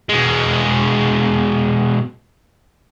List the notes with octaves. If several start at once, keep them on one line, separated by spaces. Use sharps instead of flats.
B2 G#3